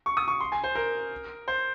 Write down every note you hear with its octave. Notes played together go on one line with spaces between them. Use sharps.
C#6
D#6
C#6
C6
G#5
C5
A#4
C5